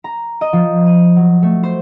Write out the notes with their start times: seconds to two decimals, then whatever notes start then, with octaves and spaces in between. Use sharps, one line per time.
0.04 A#5
0.41 D#5
0.53 F3
0.86 D#7
1.16 F#3
1.43 A3
1.63 C5